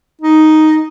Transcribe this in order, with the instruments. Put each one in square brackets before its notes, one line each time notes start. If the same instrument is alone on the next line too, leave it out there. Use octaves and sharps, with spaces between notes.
[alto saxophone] D#4